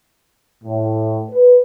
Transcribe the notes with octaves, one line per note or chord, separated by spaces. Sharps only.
A2
B4